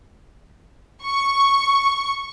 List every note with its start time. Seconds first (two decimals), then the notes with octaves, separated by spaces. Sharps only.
1.04 C#6